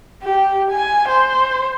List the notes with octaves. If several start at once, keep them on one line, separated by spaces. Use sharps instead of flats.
G4
G#5
C5